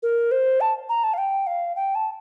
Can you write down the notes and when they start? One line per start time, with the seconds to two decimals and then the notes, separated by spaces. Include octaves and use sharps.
0.03 A#4
0.32 C5
0.61 A5
0.89 A#5
1.04 A5
1.14 F5
1.18 G5
1.47 F5
1.76 G5
1.95 A5